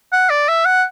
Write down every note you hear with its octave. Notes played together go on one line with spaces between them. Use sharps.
F#5
D5
E5
F#5